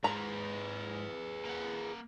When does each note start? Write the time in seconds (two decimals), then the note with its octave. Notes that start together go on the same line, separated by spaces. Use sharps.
0.04 G#2 G#4 B4 A#5
1.45 A#3 F#5